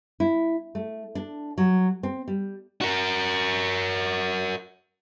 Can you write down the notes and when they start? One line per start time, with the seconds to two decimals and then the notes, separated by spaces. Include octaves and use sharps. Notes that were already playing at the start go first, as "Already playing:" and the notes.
0.20 E4
0.75 A3
1.15 D4
1.58 F#3
2.03 C4
2.28 G3
2.81 F#4 A#4